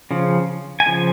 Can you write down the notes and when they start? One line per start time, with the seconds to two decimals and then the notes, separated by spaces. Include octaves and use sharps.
0.11 C#3 F3
0.80 G#5
0.86 C#3 F3